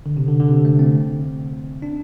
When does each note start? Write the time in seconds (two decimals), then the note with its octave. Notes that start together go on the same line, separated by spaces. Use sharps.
0.06 D3
0.17 C3
0.28 D3
0.39 D3
0.51 C3
0.65 A3
0.79 C4
1.82 D4